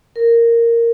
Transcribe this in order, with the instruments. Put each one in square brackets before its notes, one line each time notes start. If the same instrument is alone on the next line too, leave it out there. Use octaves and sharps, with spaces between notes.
[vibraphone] A#4